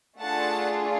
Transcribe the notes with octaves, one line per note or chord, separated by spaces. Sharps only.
A3 D4 F4 G#4 F#5 A5